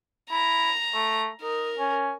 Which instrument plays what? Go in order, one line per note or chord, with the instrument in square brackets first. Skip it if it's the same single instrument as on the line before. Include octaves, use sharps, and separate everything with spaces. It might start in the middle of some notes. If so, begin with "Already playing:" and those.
[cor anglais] E4 [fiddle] A#5
[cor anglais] A3
[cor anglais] D#4 [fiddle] A#4
[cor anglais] C#4